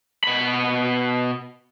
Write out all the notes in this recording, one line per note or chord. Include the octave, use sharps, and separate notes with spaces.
B2 B5